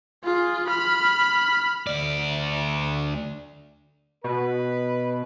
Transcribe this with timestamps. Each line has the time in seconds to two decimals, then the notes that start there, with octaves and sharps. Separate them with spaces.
0.24 F4 G#4
0.67 B5 F6
1.87 D2 D5
4.24 B2 B4